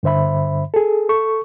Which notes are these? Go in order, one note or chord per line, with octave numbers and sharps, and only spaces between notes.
G2 D3 C5 E5 B5
G#4 A4
A4 C#6